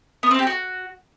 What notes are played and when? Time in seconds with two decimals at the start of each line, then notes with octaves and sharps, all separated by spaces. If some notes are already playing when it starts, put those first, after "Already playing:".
0.23 B3
0.31 C4
0.39 G4
0.47 F#4